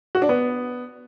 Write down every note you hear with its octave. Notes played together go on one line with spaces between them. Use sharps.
F#4
D4
B3